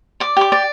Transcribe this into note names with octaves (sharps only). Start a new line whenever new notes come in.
D5 D6
G4 D6
D5